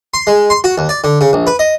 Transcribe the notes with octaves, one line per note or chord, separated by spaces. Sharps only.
C6
G#3
C6
F#4
D#2
D5
D3
C#3
A#1
B4
D#5